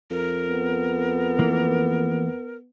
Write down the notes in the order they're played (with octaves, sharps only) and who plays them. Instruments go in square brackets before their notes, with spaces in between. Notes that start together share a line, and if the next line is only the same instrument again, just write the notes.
[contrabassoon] F2 [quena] A#4
[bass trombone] B3
[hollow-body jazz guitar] E3 A#3